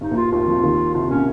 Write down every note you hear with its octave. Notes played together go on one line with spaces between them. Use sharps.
G2 D#4
A#1 A#2
F4
D#2 D#3 F4
F2 F3
D#2 D#3
C2 C3 F4
A#2 C#4